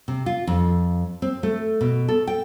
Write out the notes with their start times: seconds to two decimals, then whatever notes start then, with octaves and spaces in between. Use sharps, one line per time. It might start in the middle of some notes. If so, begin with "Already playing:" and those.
0.08 C3
0.26 F4
0.47 F2
1.22 C4
1.43 A3
1.81 B2
2.08 A4
2.27 G5